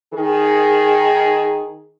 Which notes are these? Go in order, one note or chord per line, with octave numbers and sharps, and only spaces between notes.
D#3 G#4